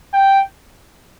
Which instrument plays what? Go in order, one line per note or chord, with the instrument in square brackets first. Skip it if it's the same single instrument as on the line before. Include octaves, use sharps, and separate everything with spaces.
[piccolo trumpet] G5